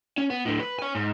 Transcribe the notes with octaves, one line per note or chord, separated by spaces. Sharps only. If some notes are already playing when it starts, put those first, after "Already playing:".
C#4
B3
A2 D3
B4
C#5 G#5
G#2